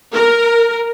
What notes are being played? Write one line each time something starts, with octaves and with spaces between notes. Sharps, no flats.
A#4